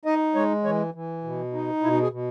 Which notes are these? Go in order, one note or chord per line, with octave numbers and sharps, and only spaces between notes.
D#4 D#5
G#3 C#5
E3 C#5
E3
B2
D#4
B2 E4
G#4
B2